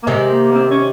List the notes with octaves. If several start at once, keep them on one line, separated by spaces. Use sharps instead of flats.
A#3
C3 D#3 G#3
A#3
A#3
C4
C#4